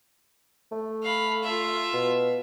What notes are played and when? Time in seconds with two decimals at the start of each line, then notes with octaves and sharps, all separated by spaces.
0.72 A3
1.03 F5 B5
1.43 F4 E5
1.93 B2